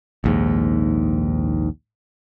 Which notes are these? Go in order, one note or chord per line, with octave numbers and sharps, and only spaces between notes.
A#1 D#2 G#2